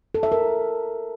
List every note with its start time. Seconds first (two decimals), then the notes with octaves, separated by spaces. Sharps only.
0.14 A4
0.23 E5
0.32 A#4